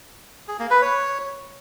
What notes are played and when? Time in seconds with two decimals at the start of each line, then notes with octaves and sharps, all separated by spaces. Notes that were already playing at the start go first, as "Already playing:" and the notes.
0.48 G#4
0.59 A#3
0.71 B4
0.82 C#5